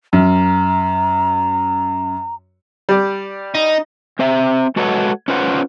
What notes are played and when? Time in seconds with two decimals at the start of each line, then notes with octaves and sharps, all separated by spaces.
0.13 F#2 A#5
2.89 G3 D5
3.55 D#4
4.19 C4 C5 E5
4.76 G#3 F#4 A4 B4 C#5 F#5
5.28 C#4 F4 B4 C5 F#5